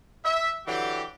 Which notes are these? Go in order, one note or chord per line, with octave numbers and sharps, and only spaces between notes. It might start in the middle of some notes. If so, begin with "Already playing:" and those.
E5
D3 E3 F#3 G4